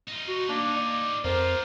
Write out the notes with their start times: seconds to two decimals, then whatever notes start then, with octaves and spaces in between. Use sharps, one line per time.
0.08 D#4 F4
0.28 F#4
0.49 A#3 D4
0.77 D5
1.25 F2 F4 G4 A#4 C5